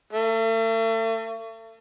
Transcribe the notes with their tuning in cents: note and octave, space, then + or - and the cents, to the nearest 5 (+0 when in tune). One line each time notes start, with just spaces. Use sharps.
A3 +40